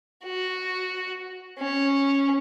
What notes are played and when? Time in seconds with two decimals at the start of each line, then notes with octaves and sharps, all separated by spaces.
0.25 F#4
1.59 C#4